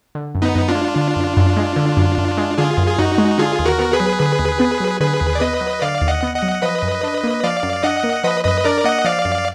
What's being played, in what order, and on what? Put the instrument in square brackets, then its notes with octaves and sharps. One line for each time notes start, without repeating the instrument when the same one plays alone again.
[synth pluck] D3
F#2
[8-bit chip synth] B3 D#4
[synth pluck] F#2
[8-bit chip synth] D4 F4
[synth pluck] G#3
D3
F#2
F#2
G#3
D3
F#2
F#2
G#3
[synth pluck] D3 [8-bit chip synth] F4 G#4
[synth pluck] F#2
[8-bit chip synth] G#4
[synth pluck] F#2 [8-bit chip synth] D#4 F#4
[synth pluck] G#3
[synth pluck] D3 [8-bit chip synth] F4 G#4
[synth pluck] D#2
[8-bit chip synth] F#4 A#4
[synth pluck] B3
[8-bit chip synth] G#4 B4
[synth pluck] F#3
D3
D#2
B3
F#3
[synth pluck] D3 [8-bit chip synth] G#4 B4
[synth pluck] D#2
[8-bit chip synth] D5
[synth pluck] B3 [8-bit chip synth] B4 D#5
[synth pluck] F#3
[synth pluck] D3 [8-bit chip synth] D5 F5
[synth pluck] D#2
[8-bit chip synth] D#5 F#5
[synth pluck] B3
[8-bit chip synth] D#5 F#5
[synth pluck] F#3
[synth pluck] F3 [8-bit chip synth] B4 D#5
[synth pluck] F#2
D4
A#3
[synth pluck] F3 [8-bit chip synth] D5 F5
[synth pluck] F#2
[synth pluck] D4 [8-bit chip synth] D#5 F#5
[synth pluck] A#3
[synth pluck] F3 [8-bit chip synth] B4 D#5
[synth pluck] F#2 [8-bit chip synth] B4 D#5
[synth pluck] D4 [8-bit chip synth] A#4 D5
[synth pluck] A#3 [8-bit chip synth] D#5 F#5
[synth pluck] F3 [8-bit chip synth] D5 F5
[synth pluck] F#2